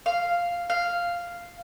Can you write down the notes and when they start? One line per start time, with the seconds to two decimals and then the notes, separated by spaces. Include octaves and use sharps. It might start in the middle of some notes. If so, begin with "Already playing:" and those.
0.06 F5
0.70 F5